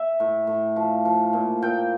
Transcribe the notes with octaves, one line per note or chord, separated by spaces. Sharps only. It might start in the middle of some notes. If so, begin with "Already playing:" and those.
Already playing: E5
A2
A2
F3
F3
A#2
A#2 G5